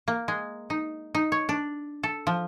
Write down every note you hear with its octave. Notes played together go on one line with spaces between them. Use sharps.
A#3
G#3
D#4
D#4
C#5
D4
A4
F3